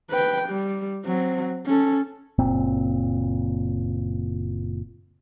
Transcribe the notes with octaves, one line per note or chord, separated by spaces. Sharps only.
B4 G5
G3
F#3 C4
C#4 A4
F#1 A#2 C4